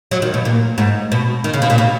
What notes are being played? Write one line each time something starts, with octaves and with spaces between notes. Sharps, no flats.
F#3
D#3
B2
A#2
G#2
B2
D#3
C#3
B2
A#2
B2